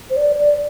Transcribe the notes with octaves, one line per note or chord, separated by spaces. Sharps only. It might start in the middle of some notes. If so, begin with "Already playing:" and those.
C5
D5
D5